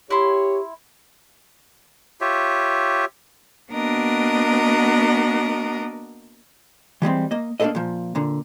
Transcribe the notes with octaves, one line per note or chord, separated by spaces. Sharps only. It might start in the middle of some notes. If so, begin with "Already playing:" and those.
E4 G4 C#5 C6
F4 G4 C#5 E5
A#3 B3 D4 F#4 A#4 D#5
E3 G3 G#3 C4
A#3 D#5
A#3 D4 D#4 G#4 A4 D#5
A#2 F3
A#2 D3